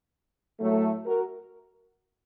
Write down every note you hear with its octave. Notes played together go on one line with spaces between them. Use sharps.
A2 F#3 A3
F#4 A#4